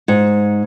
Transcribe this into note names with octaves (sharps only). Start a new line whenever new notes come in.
G#2